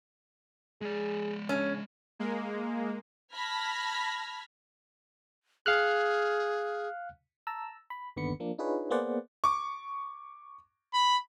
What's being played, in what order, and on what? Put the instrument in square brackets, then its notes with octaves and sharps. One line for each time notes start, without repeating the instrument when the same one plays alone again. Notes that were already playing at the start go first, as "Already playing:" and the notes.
[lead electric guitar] G#3 D5 [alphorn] G#4
[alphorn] C#3 [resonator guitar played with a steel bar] C#4
[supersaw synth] G#3 A#3
[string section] A5 B5 F6 G#6 A#6 B6
[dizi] G#4 [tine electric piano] F5 F6 F#6
[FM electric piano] A5 A#5 E6
B5
G1 D#2 D3 B3 B5 C#7
F3 A#3 D4
D4 D#4 F4 G#4 B4 C#5
A#3 B3 G#4 C5 D5 F#5
[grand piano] C#6 D6
[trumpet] B5